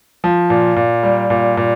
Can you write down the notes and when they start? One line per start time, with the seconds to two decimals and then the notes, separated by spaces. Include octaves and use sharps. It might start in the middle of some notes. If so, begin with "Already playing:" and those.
0.24 F3
0.50 A#2
0.76 A#2
1.03 G3
1.30 A#2
1.57 A#2